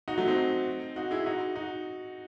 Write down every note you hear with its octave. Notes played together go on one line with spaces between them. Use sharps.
D#4 F#4
F#3 A3
C4 D#4
D#4 F#4
E4 G#4
D#4 F#4
D#4 F#4